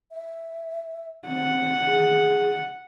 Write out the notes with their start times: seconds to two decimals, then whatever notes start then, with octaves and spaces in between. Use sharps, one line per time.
0.12 E5
1.28 C4 F#5
1.86 G#4